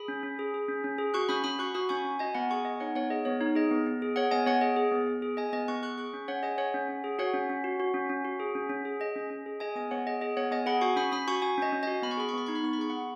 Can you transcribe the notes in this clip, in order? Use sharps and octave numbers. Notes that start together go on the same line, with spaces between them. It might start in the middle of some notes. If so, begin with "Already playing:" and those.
Already playing: G#4 B5 D#6
C#4
C#4
G#4
G#4
C#4
C#4
G#4
F#4 C#6 F#6
C#4 B5 D#6
C#4 B5 D#6
F#4 C#6 F#6
F#4 B5 D#6
C#4 G#5 C#6
C#4
F#4 D#5 G#5
B3 F#5 B5
G#4 G#5 C#6
B3 D#5 G#5
D#4 C#5 F#5
B3 C#5 F#5
G#4 D#5
B3 C#5
D#4 C#5
G#4 D#5
B3
B3
G#4
G#4 C#5 F#5
B3 D#5 G#5
B3 C#5 F#5
G#4 D#5
G#4
B3
B3
G#4
G#4 D#5 G#5
B3 D#5
B3 C#6 F#6
G#4 C#6 F#6
G#4 C#6 F#6
C#4
C#4 C#5 F#5
G#4 D#5 G#5
G#4 C#5 F#5
C#4
C#4
G#4
F#4 C#5 F#5
C#4
C#4
F#4
F#4
C#4
C#4
F#4
G#4
C#4
C#4
G#4
G#4 D#5
C#4
C#4
G#4
G#4 D#5 G#5
B3 D#5 G#5
B3 C#5 F#5
G#4 D#5
G#4 D#5
B3 C#5 F#5
B3 D#5 G#5
G#4 F#5 B5
F#4 G#5 C#6
C#4 B5 D#6
C#4 B5 D#6
F#4 G#5 C#6
F#4 G#5 C#6
C#4 D#5 G#5
C#4
F#4 D#5 G#5
B3 B5
C#6
G#4 B5
C#6
B3 B5
D#4 C#6
B5
B3 C#6
B5
G#4 C#6
B3 F#5 B5